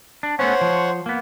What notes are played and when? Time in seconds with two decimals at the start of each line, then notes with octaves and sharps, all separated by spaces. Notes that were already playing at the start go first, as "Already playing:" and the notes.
0.23 D4
0.39 A3 B3 C#4 C5 C#5 F#5
0.61 F3
1.06 A#3 B3